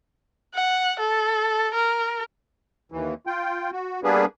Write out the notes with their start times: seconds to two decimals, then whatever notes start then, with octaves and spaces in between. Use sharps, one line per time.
0.55 F#5
1.00 A4
1.74 A#4
2.92 D#2 E3
3.27 F4 G5
3.72 F#4
4.04 G3 A#3 B3 D4 G#4 B4